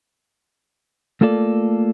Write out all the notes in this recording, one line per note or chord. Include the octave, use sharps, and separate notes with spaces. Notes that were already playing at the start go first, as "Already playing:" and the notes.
A3 A#3 F4 A4 D5